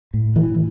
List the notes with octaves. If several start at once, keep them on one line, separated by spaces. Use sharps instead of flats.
A2
E3